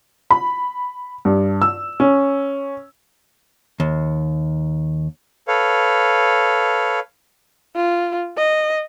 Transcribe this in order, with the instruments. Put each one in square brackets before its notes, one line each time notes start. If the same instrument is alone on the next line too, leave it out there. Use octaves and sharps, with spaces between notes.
[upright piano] B5
G2
E6
C#4
[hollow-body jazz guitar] D#2
[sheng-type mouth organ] A4 B4 C#5 F5
[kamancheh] F4
D#5